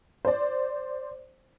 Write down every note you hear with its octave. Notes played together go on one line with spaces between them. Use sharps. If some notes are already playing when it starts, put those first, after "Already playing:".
C5 D5